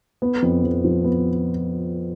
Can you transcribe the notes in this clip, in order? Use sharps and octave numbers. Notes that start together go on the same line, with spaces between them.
B3
F2
F2
F3
B3